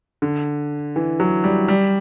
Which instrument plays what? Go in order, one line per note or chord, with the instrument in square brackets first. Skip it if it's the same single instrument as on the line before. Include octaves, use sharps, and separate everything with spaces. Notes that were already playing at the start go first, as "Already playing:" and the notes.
[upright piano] D3
E3
F#3
G3
G3